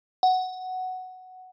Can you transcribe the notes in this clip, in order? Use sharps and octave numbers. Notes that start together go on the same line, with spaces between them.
F#5